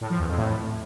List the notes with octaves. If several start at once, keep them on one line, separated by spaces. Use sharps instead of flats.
A2
F3
E2
F2
A2